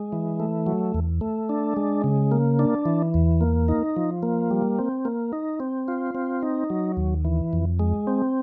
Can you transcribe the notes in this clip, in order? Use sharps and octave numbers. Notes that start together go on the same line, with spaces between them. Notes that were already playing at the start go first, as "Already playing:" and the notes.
Already playing: G#3
E3
A3
F#3
E2
A3
D4
G#3
C#3
A#3
D4
E3
E2
A#3
D#4
F3
A#3
G3
C4
A#3
D#4
C4
F4
C4
D#4
F#3
D#2
E3
F2
G#3
C4